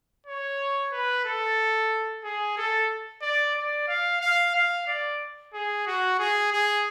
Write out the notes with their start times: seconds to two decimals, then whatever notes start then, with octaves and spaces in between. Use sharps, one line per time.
0.26 C#5
0.92 B4
1.25 A4
2.24 G#4
2.57 A4
3.22 D5
3.55 D5
3.88 F5
4.21 F5
4.55 F5
4.87 D5
5.54 G#4
5.87 F#4
6.19 G#4
6.52 G#4